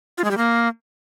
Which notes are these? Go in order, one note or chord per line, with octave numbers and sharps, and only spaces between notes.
F4
G#3
G3
A#3